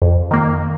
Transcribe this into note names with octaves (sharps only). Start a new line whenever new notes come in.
F2
D#3 A#3